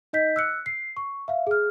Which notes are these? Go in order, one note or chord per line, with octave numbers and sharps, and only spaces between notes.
D#4 D#5 G6 B6
E6 F#6 C#7
C7
C#6
E5 F5
G#4 F6